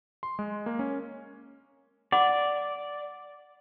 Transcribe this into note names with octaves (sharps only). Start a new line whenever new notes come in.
C6
G#3
A#3
C#4
D5 F#5 B5 D6